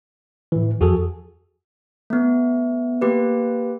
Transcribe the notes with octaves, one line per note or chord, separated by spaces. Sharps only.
A2 E3
F2 F#4 G#4 A4
A3 B3
A#3 G4 B4